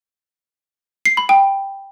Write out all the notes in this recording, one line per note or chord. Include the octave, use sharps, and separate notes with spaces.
C7
B5
G5